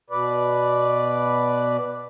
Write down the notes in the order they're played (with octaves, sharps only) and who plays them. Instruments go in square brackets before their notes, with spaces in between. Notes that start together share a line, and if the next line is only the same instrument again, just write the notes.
[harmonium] B2 B4 D5